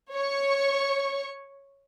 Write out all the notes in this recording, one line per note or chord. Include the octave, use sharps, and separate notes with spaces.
C#5 C#6